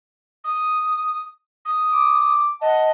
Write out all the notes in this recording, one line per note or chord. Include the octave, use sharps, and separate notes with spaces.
D#6
D#6
D6
D#5 F#5 A5